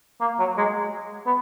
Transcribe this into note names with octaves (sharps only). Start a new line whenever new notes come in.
A#3
F#3
G#3
B3